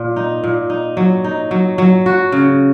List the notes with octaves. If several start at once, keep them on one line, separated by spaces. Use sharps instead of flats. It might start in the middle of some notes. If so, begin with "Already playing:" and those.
Already playing: A#2
D#4
A#2
D#4
F#3
D#4
F#3
F#3
F#4
C#3